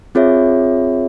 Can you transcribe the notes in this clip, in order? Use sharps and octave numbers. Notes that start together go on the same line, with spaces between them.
C4 F4 G#4 C#5 E5